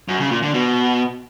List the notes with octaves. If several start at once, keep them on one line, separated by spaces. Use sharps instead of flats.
F#2
C#3
A#2
D3
B2